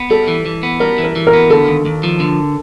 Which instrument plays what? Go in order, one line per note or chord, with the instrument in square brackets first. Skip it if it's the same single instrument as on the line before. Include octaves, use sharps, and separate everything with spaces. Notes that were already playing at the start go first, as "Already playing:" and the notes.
Already playing: [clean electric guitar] B3
[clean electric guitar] G3 [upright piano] A4
[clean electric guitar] E3
E3
B3
[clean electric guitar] G3 [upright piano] A#4
[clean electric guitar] E3
[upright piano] A#4
[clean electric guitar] E3
[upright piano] A#4
[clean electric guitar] B3
[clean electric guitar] D3 [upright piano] A4
[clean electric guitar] D#2
D#2
F3
D3